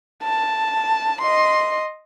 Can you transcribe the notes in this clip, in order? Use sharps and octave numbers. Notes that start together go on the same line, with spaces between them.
A5
D#5 C6